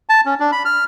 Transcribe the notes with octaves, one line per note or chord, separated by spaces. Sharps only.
A5
C#4
D4
B5
F6